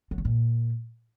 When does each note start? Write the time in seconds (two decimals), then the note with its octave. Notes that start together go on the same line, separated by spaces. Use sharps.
0.11 F#3
0.18 C#3
0.25 A#2